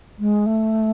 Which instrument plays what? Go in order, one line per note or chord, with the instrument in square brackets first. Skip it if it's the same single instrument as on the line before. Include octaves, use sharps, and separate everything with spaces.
[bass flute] G#3
A3